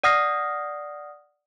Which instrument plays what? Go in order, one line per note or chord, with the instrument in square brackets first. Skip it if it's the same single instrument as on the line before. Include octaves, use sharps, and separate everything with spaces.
[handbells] D5 F#5 D#6 F6 A#6 C7